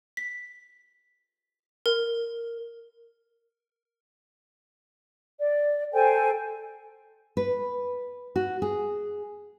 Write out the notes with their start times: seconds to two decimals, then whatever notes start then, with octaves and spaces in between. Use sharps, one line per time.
0.17 B6
1.86 A#4
5.39 D5
5.93 A4 C5 G5 G#5
7.37 B4
8.36 F#4
8.62 G#4